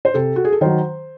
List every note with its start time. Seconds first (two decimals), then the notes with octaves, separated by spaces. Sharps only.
0.05 C5
0.14 C3 A4
0.36 F#4
0.45 G#4
0.52 A4
0.61 D#3 F#3 C5